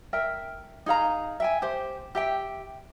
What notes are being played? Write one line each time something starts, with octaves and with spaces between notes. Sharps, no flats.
A#4 E5 G5
D#4 G#4 F5 A#5
E5 G5 G#5
G4 C5
G4 E5 G5